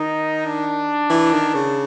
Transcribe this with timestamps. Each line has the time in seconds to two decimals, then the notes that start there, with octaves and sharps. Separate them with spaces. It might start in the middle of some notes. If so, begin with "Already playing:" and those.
Already playing: D#3 D#4
0.45 D4
1.10 E3
1.32 D#3
1.54 C#3